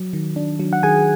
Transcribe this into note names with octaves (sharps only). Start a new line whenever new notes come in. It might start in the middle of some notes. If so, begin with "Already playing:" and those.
Already playing: F#3
D#3
D4
F#3
F#5
D#3 G#4 G#5